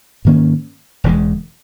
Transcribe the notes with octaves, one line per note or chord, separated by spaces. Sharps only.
G#2 D#3 A#3 C#4
E1 E2 C#3 G#3